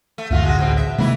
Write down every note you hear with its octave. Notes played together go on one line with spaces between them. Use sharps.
A3
C#2 F#2 D3 A3 F4 F#4
A1 D2 G#3 F#4
B2 C4
E5
C3 D#3 E3 G#3 A#3 E4